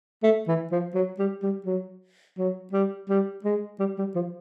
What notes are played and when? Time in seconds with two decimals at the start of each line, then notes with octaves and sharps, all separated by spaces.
0.23 A3
0.47 E3
0.72 F3
0.94 F#3
1.19 G3
1.43 G3
1.66 F#3
2.38 F#3
2.73 G3
3.09 G3
3.44 G#3
3.79 G3
3.98 G3
4.15 F3